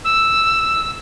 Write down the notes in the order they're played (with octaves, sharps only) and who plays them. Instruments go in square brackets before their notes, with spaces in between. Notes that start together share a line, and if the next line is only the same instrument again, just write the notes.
[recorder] E6